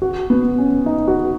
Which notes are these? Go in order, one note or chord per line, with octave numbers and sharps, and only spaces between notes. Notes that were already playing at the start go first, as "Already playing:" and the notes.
F#4
B3
C#4
D#4
F#4